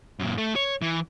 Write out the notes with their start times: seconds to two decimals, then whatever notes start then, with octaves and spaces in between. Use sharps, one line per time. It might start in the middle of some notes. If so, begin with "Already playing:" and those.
0.19 F#2 A#2
0.38 A3
0.56 C#5
0.82 E3